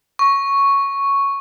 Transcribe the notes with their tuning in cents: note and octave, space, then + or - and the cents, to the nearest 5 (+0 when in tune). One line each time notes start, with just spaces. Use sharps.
C#6 +0